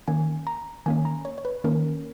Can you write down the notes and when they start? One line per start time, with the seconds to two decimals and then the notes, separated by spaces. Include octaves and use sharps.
0.08 D#3 A#3 C#4 G#5
0.47 A#5
0.86 D#3 A#3 C#4 G#5
1.05 A#5
1.25 C#5
1.38 C#5
1.45 B4
1.64 D#3 A#3 C#4 A#4